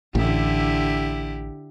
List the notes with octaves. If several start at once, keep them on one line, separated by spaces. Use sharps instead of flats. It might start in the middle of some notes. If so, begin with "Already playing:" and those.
A1 D3 E4 G4